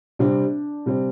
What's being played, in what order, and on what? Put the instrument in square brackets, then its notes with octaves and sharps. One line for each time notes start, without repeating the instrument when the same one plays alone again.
[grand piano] C3 G3 C4 [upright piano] D4
[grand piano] C3 G3 C4